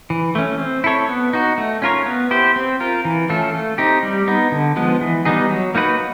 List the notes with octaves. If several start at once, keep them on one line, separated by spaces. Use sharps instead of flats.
E3
A3 C#4
C4
E4 A4 C#5
B3
D#4 F#4
A3
C#4 F4 A#4 C#5
B3
E4 G4 C5
C4
F4 A#4
E3
A3 C#4 F4 A4
A3
C4 D#4 G4
G3
B3 D#4
D3
F3 G#3 B3
E3
G3 B3 D#4 G#4
F#3
A#3 D#4 F#4 B4